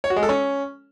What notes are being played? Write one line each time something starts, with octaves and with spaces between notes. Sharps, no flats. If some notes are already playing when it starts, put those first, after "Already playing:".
C#5
F#4
G#3
A4
C#4